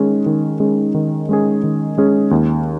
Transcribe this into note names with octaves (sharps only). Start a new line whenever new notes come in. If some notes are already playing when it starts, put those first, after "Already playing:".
Already playing: D#3 G#3 C#4 G#4
D#3
G#3 C#4 G#4
D#3
G#3 C#4 G#4
D#3
G#3 C#4 G#4
D#2